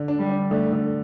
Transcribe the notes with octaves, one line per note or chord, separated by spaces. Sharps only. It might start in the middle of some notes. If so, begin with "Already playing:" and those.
Already playing: D3
D4
G3
D4
D3 A3
D3